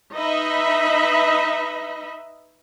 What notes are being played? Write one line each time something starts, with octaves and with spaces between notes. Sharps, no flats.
D#4 B4 D#5 E5 B5